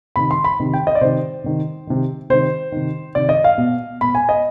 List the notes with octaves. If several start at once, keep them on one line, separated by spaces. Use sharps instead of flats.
C3 D#3 B5
C6
B5
C3 D#3
G5
D#5
D5
C3 D#3 C5
C3 D#3
C3 D#3
C3 D#3 C5
C3 D#3
C3 D#3 D5
D#5
F5
B2
B2 B5
G#5
D#5